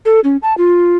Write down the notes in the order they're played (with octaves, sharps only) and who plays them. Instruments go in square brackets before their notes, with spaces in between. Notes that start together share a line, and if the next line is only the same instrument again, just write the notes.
[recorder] A4
C#4
A5
F4